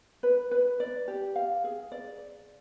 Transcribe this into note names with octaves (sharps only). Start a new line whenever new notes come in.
B4
B4
D5
G4
F5
G#4
D5